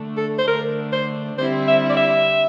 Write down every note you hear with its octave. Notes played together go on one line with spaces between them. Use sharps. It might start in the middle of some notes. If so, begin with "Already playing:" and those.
Already playing: D3 A3 D4
A4
C5
D3 A3 D4 A#4
C5
D3 G3 C4 E4 C5
E5
D5
E5